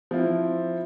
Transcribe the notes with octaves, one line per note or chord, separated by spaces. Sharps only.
F3 C4 E4